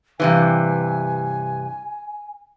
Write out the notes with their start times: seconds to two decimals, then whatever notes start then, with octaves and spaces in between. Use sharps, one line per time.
0.20 G2 C3 E3 G#5